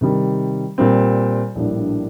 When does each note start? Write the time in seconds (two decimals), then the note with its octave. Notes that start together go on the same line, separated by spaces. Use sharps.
0.01 C3 D#3 G3
0.78 A#2 G3 C4
1.55 A#1 A2 G3 A#3 D4